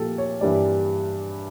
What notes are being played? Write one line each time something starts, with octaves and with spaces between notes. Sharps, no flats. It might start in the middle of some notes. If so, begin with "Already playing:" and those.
Already playing: A#2 F3 A#3 F4 G4 A4
C#5
G2 E3 G3 A#3 D5